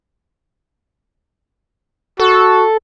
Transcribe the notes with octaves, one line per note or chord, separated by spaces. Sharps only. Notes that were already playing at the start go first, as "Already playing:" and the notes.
F#4 A4